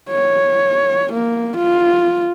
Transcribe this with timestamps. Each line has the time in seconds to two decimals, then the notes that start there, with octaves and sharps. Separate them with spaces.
0.11 C#5
1.13 A#3
1.57 F4